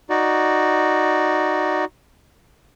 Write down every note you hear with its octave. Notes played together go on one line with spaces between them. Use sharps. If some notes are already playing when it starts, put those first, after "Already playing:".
D#4 F#4 D5